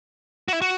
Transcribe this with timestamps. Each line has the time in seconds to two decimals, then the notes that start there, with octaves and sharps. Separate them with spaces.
0.48 F#4
0.53 E4
0.62 F#4